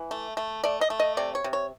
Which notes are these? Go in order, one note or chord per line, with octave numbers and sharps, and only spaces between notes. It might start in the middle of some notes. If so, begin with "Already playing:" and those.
Already playing: E3
A3
A3
A3 D5
D#5
A3
D#5
C3 D5
C#5
C3
C#5